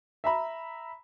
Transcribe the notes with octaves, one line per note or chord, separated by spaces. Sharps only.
E5 A#5 B5